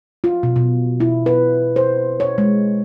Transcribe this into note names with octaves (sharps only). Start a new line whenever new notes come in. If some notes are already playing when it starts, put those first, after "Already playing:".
F4
B2
B2
E4
B4
C5
C#5
G#3